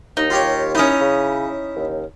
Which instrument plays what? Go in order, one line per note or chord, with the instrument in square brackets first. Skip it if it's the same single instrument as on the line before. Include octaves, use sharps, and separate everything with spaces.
[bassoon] D#2 [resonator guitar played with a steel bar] D#4
[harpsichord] F4 G4 C#5
[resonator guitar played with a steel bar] C#4 D#4 [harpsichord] E4 D#6
[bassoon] C#3
D#2